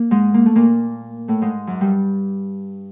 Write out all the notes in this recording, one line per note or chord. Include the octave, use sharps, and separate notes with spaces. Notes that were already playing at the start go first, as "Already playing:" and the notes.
Already playing: A#3
G#2 G#3
A#3
A3
A#2 A#3
A2 A3
G#2 G#3
F#2 F#3
G2 G3